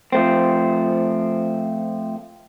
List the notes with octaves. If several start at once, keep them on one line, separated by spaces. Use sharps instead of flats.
F3 A3 C4